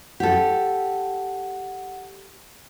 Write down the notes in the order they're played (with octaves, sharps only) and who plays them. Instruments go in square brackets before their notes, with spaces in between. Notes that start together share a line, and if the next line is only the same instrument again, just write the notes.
[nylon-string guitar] G4 A4 [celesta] F#5